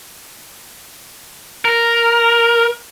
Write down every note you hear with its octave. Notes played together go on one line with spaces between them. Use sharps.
A#4